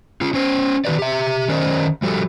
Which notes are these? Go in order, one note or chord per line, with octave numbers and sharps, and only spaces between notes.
C#4 F4
C#4 C5
D#3 F#4 B4 D5
G4 E5
D#3 C#4 A#4 C5 D5 D#5
F3 G3 F#4 G4 A4